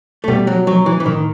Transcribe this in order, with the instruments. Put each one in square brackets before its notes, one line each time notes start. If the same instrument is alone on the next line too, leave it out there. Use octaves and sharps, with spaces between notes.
[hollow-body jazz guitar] A3
[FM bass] B2 [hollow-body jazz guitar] G3
[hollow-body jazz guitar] F#3
F#3
E3
E3
[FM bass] A2 [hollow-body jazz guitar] D#3